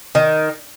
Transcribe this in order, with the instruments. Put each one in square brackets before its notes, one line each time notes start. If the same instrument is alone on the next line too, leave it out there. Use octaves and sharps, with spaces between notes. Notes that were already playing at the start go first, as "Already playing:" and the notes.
[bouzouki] D#3